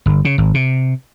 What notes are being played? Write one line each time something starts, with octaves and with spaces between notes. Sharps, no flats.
G1
C#3
G#1
C3